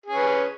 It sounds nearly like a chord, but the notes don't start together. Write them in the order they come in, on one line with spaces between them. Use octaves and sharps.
G#4 C#4 B4